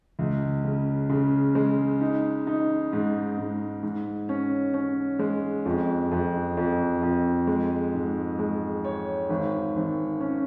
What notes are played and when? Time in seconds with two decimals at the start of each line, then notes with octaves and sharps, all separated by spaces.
0.19 C#2
0.64 C#3
1.09 C#3
1.55 G#3
2.01 D#4
2.47 D#4
2.93 G#2
3.38 G#2
3.83 G#2
4.29 C#4
4.74 C#4
5.19 G#3
5.65 F2
6.11 F2
6.57 F2
7.02 F2
7.47 G#3
7.94 G#2
8.39 G#3
8.85 C#5
9.30 G#1
9.76 G#1
10.21 C#4